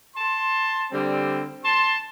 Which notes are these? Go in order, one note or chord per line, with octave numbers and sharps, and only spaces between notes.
A5 C6
D3 G3 C4
A5 C6